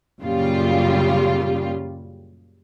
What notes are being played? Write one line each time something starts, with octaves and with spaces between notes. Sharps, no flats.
F#2 A#2 C#3 G3 F4